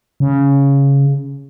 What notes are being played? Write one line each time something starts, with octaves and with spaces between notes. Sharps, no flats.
C#3